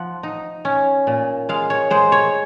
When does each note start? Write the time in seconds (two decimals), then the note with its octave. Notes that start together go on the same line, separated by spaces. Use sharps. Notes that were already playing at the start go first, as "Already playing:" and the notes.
Already playing: F3 F#5
0.23 D#4
0.65 C#4
1.07 A#2
1.49 G#3 F5
1.70 C#5
1.90 G#3 C5
2.12 C#5